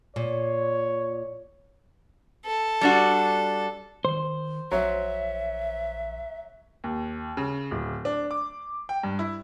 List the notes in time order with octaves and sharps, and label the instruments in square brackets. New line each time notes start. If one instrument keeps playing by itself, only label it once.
[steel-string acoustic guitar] A#2 [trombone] C#5
[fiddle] A4
[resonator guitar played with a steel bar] G3 D4 F#4
[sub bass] D#3 [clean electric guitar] C5
[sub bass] A#1 [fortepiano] F#3 [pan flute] E5
[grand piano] D#2
C#3
D1
D4
D6
G5
G2
E4